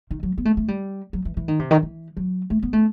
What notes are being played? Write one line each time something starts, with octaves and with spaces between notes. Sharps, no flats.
D#3
F#3
B3
A3
A3
G3
F#3
E3
E3
D#3
C3
D#3
E3
F#3
A3
B3
A3